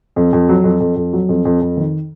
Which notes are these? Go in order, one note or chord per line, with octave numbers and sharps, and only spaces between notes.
F2
F2
F#3
F2
F2
F2
F#3
F2
F2
F2
D#3